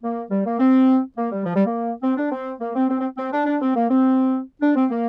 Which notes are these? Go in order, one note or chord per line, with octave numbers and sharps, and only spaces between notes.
A#3
G3
A#3
C4
A#3
G3
F3
G3
A#3
C4
D4
C4
A#3
C4
C4
C4
C4
D4
D4
C4
A#3
C4
D4
C4
A#3